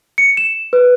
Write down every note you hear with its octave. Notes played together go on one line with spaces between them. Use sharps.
C#7
E7
B4